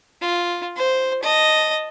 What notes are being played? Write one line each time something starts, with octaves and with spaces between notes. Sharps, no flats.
F4
C5
D#5 A5